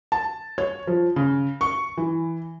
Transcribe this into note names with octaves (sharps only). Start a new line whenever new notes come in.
A5
C#5
F3
C#3
C#6
E3